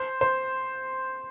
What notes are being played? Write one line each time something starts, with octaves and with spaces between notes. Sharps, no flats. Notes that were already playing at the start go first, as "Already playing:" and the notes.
Already playing: C5
C5